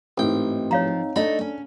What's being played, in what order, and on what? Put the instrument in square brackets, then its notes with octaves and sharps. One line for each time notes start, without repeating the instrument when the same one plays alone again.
[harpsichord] A1 G5 [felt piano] G#2 C4
[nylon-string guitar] F3 [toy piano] C#5 F5 A#5
[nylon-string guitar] A3 D#4 D#5 [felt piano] D4 A4 [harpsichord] B5
[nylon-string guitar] C#4